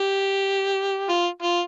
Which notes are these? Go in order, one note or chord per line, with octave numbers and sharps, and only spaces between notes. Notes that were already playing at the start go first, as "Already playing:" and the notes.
Already playing: G4
F4
F4